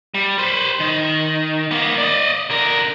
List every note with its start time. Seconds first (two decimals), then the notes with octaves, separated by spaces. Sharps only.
0.14 G3
0.38 B4 C5
0.80 D#3
1.71 A#3 B3
1.98 D5 D#5
2.50 D3 A#4